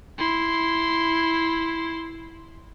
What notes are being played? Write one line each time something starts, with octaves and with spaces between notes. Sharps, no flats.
E4 C6